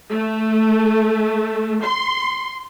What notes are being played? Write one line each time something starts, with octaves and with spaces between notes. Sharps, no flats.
A3
C6